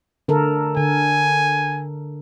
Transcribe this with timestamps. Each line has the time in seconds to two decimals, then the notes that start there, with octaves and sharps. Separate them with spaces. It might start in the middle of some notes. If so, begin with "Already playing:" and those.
0.28 D3 A4 A#4
0.77 D3 G#5